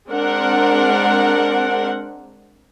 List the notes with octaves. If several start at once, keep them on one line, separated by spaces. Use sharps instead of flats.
G#3 C4 D4 A#4 F#5